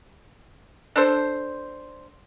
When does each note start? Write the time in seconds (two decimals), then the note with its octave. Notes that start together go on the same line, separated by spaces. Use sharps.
0.96 D4 A4 C5